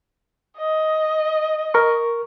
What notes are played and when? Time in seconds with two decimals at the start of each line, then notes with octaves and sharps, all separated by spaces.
0.58 D#5
1.74 A#4 C#6